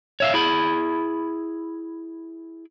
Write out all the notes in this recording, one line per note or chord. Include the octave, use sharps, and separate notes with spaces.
C#5 E5 F5
E4 G#4 B5